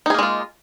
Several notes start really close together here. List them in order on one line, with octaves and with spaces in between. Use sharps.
D#4 G#4 A#3 G#3 F4